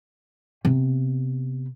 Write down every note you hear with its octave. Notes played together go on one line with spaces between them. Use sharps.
C3 B3